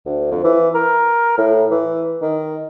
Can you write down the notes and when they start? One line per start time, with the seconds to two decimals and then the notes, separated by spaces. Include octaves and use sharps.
0.06 D2
0.31 F2
0.44 E3
0.75 A#4
1.38 A2
1.71 E3
2.22 D#3